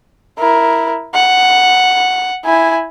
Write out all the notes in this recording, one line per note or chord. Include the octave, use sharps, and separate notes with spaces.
E4 A#4
F#5
E4 G#5